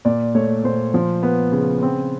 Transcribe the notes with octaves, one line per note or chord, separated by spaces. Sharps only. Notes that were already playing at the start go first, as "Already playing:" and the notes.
A#2 D5
A3 C#5
A#2 C5
F3
B3
C#3
C4